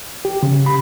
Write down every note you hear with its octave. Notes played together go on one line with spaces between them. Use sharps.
G4
C#3
B5